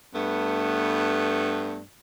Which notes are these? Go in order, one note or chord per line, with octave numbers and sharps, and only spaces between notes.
G2 A3 B3